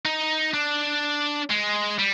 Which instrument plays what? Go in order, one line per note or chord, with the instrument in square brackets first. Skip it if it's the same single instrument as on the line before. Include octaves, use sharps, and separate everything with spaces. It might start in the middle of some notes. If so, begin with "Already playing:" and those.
[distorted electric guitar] D#4
D4
G#3
G3